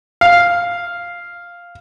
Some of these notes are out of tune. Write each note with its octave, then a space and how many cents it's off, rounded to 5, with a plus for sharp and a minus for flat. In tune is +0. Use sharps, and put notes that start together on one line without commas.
F5 +0